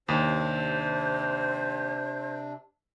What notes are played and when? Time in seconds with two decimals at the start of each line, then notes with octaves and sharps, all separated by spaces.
0.08 D#2 C3 D4 C5